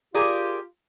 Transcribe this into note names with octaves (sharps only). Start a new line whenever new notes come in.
F4 G4 G#4 A#4 D5